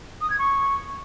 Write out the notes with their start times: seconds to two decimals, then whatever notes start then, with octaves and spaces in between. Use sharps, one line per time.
0.21 D#6
0.30 G#6
0.39 C#6